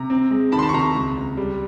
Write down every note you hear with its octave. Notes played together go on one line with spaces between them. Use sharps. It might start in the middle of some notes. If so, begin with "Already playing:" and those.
Already playing: C3 A#5
C4
G#3
D#3 A5 B5
C6
A5 B5
C#6
C3 A#5 C6
C#2
C#2
G3